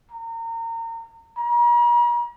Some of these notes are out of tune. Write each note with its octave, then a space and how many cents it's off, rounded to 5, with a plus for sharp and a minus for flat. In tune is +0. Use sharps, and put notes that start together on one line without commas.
A#5 -30
A#5 +45